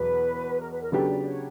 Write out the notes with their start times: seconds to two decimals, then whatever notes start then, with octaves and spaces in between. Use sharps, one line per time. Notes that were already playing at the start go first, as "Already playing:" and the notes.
Already playing: E2 B2 F#3 B4
0.59 A#4
0.71 B4
0.81 A#4
0.92 C#3 F#3 B3 D4 G4 A4
1.09 D5
1.25 C#5